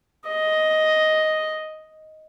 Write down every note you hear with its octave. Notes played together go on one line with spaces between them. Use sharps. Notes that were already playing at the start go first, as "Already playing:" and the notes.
D#5